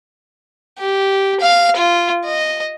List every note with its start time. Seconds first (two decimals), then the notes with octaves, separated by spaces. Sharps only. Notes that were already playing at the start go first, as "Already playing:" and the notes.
0.79 G4
1.40 F5
1.76 F4
2.25 D#5